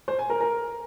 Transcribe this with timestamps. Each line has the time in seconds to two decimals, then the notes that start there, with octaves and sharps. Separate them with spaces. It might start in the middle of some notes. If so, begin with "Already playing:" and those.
0.08 C5
0.19 G#5
0.30 A#4
0.41 A#4